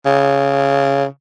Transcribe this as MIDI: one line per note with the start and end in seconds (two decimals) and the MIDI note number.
0.06 1.05 49